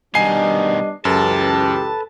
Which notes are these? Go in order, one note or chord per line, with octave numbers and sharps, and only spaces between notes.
B2 D#3 G3 B3 D4 D#5 G#5 C7
C#2 F#2 E3 G4 A4 B4 A5